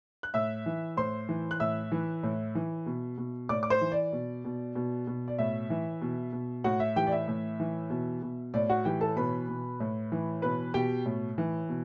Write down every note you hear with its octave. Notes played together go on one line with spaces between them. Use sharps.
F#6
A2 E5 E6
E3
A2 C5 C6
E3
F#6
A2 E5 E6
E3
A2
E3
B2
B2
A2 D5 D6
D6
C5 C6
E3
D5
B2
B2
B2
B2
D5
A2 E5
E3
B2
B2
A2 F#4 F#5
E5
E3 G4 G5
D5
E5
A2
E3
B2
B2
A2 D5
F#4 F#5
E3 G4 G5
A4 A5
B2 B4 B5
B2
A2
E3
B2 B4 B5
B2 G4 G5
A2
E3
B2